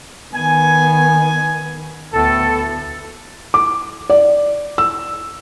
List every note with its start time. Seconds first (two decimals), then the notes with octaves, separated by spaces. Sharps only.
0.34 D#3 B3 G#5
2.13 D2 A2 B3 A4
3.54 D6
4.10 D5
4.78 E6